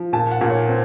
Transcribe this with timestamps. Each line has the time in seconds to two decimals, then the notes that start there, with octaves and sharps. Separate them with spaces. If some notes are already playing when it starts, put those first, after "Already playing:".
Already playing: F3
0.13 A#2 A5
0.31 F#5
0.41 A#2
0.50 C#5
0.69 C4